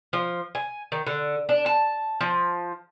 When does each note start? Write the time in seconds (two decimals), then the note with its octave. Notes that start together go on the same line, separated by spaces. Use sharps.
0.13 F3
0.55 G#5
0.92 D#3
1.07 D3
1.49 D4
1.66 A5
2.21 F3